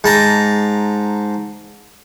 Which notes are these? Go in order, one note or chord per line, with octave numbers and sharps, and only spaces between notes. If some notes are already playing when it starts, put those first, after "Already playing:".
G#2 A5 A#5